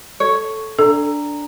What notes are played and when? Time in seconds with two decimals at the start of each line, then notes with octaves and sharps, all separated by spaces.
0.20 A4 C#5
0.79 D4 A4 A#5